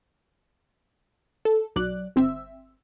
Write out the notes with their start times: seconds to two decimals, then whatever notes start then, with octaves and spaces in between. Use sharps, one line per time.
1.45 A4
1.76 B1 F#3 D5 F#6
2.16 G1 C4 E5 E6